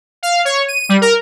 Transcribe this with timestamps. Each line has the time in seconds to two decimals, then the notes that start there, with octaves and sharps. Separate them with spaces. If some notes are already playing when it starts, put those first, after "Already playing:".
0.23 F5
0.45 C#5
0.68 D#7
0.89 G3
1.01 A#4